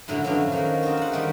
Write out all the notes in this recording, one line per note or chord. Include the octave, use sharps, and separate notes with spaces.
F#2 A2 D3 F#3 C#4 E4
D3 F3 F#3 B3 C#4 D4
D#3 A#3
C4 D#4 F4 F#4
G#3 F4 F#5
D#3 G3 A3